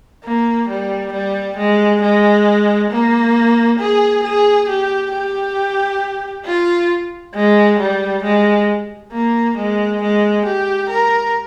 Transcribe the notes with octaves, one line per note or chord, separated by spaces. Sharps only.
A#3
G3
G3
G#3
G#3
A#3
G#4
G#4
G4
G4
F4
G#3
G3
G#3
A#3
G#3
G#3
G4
A#4